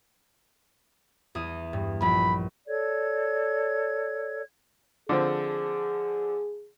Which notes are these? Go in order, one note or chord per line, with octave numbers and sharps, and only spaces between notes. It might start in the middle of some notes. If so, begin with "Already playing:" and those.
E2 D#6
G2
A#1 B5
A4 C#5 D5 G#6
D3 F3 C4 G#4